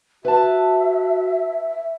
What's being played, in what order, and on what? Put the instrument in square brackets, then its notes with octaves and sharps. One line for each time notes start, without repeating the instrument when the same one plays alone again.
[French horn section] F#4 [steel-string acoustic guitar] B4 A5 [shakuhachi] E5